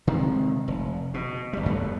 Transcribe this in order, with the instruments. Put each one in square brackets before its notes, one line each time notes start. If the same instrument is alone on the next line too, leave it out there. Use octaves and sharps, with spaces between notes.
[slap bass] C3 D#3 G#3
F1
B2
G1 G3
F#2 G3 A3 B3